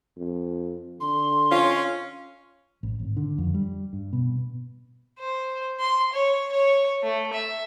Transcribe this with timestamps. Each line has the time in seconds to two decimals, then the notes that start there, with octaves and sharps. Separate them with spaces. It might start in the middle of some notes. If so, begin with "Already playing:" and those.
0.17 F2
1.00 D3 C6
1.52 C#4 F4
2.83 A1
3.00 G#1
3.17 D3
3.38 F2
3.54 G3
3.93 G2
4.13 B2
5.20 C5
5.80 C6
6.14 C#5
6.52 C#5
7.03 A3
7.33 E5